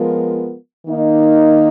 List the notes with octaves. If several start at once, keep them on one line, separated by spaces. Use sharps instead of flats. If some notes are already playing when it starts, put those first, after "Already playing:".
Already playing: F3 G#3 B3 F4 A#4
D#3 A#3 D#4